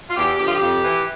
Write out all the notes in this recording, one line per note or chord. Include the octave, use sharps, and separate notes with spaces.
F4
E2 G4
D3 F3 F4 G4
G4
F2
E3